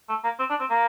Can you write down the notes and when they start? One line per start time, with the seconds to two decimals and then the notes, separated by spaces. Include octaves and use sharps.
0.09 A3
0.24 A#3
0.39 C4
0.50 D4
0.60 C4
0.70 A#3